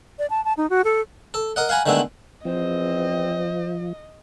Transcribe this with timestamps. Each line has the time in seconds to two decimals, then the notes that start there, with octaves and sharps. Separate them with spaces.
0.19 D5
0.30 A5
0.45 A5
0.57 D#4
0.70 F#4
0.84 A4
1.34 A4
1.56 A#4 D#5 F#5
1.69 F5 F#5 G#5 A#5 B5
1.86 D3 D#3 G#3 A3 B3 E4
2.45 E2 F3 C4 C5 D#5